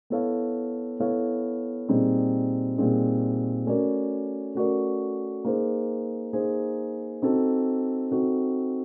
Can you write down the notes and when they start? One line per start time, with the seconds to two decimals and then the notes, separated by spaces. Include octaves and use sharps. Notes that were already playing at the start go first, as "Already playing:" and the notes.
0.10 B3 E4 A4 C#5 F5
0.99 B3 E4 A4 C#5 F5
1.89 A#2 G3 C4 D#4 G#4
2.78 A#2 G3 C4 D#4 G#4
3.66 A3 C#4 F#4 A#4 D5
4.55 A3 C#4 F#4 A#4 D5
5.45 A#3 D#4 G#4 C5
6.33 A#3 D#4 G#4 C5
7.22 C4 D#4 F#4 A4
8.11 C4 D#4 F#4 A4